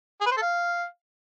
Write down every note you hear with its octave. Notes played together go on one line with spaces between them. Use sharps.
G#4
B4
C5
A4
F5